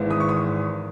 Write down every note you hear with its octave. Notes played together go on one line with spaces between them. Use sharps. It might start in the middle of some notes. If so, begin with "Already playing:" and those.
Already playing: G#1 G#2 E3
D#6
C#6
D#6